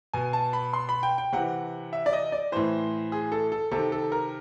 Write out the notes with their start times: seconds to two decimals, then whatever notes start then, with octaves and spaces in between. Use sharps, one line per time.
0.13 B2 G#5
0.33 A5
0.53 B5
0.73 C6
0.89 B5
1.03 G5
1.18 G5
1.33 C3 E3 F#5
1.93 E5
2.06 D5
2.13 D#5
2.32 D5
2.52 A2 E3 C5
3.12 G#4
3.32 A4
3.52 A4
3.71 C3 D#3 A4
3.92 A4
4.12 A#4